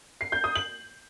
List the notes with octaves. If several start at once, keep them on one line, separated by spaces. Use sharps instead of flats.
C7
G6
D#6
F#7